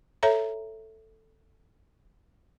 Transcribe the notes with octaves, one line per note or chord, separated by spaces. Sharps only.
A4 C#5 E5 A#5